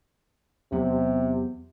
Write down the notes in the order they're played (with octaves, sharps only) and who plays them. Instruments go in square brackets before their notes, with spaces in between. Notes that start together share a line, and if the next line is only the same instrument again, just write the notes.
[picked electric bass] E2 F#3 B3 [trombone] C3